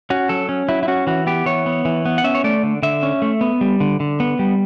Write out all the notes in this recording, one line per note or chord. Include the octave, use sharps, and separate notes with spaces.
C#4 F#4
F#3 A4
C#4
F#3 E4
E4
C#4 F#4
E3 F#4
B3 G4
E3 C#5
B3
E3
B3
F#5
C#4 E5
C#5
A3 D5
D3
D3 E5
C#4
A3
B3
G3
D3
D3
B3
G3